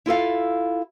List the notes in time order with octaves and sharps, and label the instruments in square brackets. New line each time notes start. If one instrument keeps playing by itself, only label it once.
[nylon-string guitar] E4 F4 A4 F5